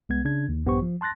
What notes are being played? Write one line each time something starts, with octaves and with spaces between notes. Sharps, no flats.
C2 G#3 B3 G#6
C#3 D4 G#6
D#2
A#1 G2 B3 G4 C5 C#6
F3
A5 C6 F#6 A6 A#6